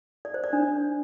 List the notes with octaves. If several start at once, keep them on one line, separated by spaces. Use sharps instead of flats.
D5
C5
D5
D4